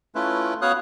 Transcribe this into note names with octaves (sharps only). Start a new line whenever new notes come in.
A3 C#4 E4 F4 B4
B3 F#4 C#5 F5 D#6 F#6